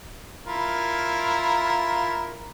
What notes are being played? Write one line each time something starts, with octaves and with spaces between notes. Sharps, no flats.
E4 F4 A#4